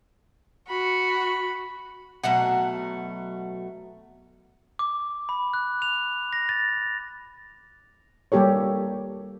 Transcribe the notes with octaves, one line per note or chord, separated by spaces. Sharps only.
F#4 B5
B2 F#3 A3 F#5
D6
B5
F#6
F7
A#6
A6
G3 A#3 G4 A4 C#5